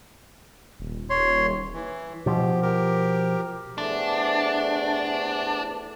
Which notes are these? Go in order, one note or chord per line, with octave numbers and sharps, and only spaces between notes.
D#1
C#5 C6
E3
B2 F3 G4
G4 A#4
E2 C3 A3 D4